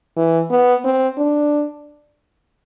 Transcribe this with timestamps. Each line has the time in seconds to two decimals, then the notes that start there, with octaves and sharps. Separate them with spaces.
0.17 E3
0.50 B3
0.84 C4
1.18 D4